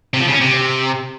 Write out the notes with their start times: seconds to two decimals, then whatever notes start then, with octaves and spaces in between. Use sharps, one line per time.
0.14 C3
0.20 F3
0.27 C#3
0.34 C#4
0.41 C3